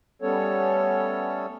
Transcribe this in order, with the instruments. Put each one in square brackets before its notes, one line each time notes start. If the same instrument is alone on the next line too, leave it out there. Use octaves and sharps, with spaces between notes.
[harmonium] G3 A3 B3 C#4 A4 C#5